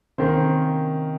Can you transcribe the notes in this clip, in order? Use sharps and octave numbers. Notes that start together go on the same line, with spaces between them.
C3 D#3 A#3 C#4 C5